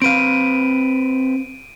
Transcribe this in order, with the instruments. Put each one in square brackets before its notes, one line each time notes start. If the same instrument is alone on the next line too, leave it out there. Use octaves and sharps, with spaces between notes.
[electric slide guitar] C4 B4 F5 [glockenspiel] D7 D#7